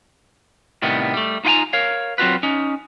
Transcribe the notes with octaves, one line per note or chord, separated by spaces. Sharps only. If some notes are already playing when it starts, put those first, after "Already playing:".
A2 C3 D#3 G3 B3
G3 A3
D#4 F4 F5 G5 G#5 A#5
A#4 C#5 F5
F#3 C4 F4 F#4 B4
C#4 D#4